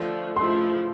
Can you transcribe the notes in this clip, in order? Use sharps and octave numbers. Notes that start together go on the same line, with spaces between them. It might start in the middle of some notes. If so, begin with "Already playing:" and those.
Already playing: D3 F3 A3
F3 A3 E4 C6